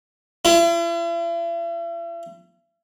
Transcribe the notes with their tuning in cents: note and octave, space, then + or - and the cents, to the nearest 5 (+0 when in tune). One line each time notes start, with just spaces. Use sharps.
E4 +45